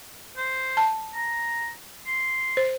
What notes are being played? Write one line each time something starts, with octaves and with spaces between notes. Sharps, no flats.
C5
A5
A#5
C6
C5